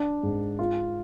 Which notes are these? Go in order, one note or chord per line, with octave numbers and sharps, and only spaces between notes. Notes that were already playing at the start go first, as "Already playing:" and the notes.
Already playing: D4
G#2
F4